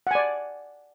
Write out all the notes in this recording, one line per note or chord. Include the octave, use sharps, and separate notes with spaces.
D5 F#5 G#5